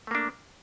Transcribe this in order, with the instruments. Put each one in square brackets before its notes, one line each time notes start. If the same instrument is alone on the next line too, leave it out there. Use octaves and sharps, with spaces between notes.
[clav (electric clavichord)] A3
A#3
D4